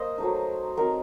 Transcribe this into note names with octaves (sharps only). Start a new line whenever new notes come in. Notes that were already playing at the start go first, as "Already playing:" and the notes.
Already playing: A#3 C5 D#5
F#3 A3 D#4
F#3 C4 D#4 A#4